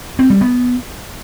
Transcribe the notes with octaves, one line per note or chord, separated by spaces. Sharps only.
C4
G3
B3